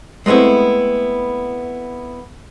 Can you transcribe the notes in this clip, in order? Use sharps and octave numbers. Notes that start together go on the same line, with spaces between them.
G#3 A3 B3 C4 E4